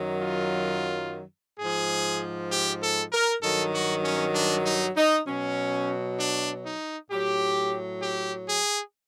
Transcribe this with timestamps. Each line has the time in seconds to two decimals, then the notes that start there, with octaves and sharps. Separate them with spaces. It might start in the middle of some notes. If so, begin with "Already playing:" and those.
Already playing: F#2 D#3 F#3
0.21 F4
1.59 G#2 F3 G#4
2.51 G4
2.81 A4
3.13 A#4
3.43 G2 D#3 F#3 A4
3.74 F#4
4.04 C#4
4.34 D4
4.65 D#4
4.96 D#4
5.26 B2 F#3 C#4
6.18 D4
6.64 D#4
7.11 A2 F#3 G4
8.02 G4
8.49 G#4